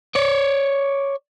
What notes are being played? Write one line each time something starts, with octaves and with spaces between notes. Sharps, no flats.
C#5 D5